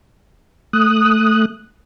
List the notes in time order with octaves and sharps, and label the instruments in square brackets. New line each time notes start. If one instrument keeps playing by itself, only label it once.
[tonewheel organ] A3 D#6 F#6